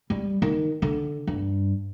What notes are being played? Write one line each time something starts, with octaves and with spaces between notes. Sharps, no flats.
G3
D#3
D3
G2